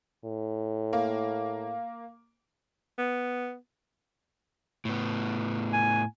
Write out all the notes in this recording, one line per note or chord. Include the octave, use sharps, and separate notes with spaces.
A2
A#3
B3
A2 B3
G#5